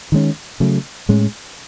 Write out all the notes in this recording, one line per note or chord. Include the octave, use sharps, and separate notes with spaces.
D#3 G#3 C#4
C#3 F#3 A3
A2 G#3 C#4